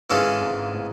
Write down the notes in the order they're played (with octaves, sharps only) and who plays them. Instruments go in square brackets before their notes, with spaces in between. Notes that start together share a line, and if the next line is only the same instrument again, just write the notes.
[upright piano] G#1 G#2 [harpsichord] E3 G#3 C#4 F4 A4
[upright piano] G#1 G#2
A2